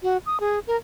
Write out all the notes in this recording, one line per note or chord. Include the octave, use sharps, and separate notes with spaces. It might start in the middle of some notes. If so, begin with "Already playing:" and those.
F#4
D#6
G#4
A#4